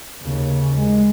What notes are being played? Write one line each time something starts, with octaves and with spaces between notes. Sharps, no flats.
D#2 C#3
G#3